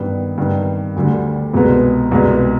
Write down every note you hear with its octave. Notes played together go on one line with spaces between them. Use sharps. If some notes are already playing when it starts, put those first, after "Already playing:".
Already playing: G2 D#3 B3
G2 D#3 B3
D2 D3 G3
C2 B2 G#3 B3
C2 B2 G#3 B3